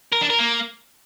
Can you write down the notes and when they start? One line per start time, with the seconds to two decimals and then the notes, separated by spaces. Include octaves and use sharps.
0.13 A#4
0.21 D4
0.30 A#4
0.39 A#3